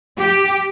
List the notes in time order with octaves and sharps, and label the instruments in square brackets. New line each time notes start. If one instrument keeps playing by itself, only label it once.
[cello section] G4